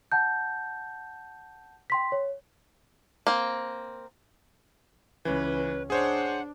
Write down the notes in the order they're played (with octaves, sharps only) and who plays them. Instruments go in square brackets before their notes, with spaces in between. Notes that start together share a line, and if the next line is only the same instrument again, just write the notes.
[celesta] F#5 A5 G6
G5 C6 B6
C#5
[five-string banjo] A#3 C4
[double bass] C#2 C#4 [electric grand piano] E3 [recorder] B4
[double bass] D4 [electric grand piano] G#4 C5 C#5 [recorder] F#5